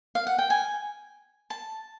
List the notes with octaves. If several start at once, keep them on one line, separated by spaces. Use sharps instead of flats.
F5
F#5
G5
G#5
A5